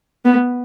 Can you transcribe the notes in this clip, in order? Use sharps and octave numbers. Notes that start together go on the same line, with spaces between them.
B3